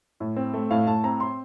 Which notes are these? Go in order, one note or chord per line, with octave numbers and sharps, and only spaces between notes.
A2
C4
A3
A2 F5
A2 A5
C4 A#5
C6